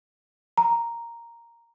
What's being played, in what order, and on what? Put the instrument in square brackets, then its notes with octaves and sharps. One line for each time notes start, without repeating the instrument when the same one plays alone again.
[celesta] A#5